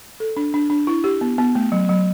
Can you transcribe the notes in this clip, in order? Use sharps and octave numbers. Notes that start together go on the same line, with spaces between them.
A4
D4
D4
D4
E4
G4
B3
B3
A3
F#3
F#3